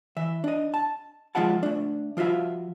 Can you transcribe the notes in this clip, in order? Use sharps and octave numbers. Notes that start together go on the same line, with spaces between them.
E3 E5
D4 D#5
A5
F3 G#3 F4 E5 F#5 A5
A3 D4
F3 F4 F#4 E5 F5